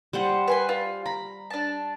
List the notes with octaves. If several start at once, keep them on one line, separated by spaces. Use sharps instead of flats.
G3 C5 F#5
B4 G#5 C6
F4
A#5 B5
D4 A5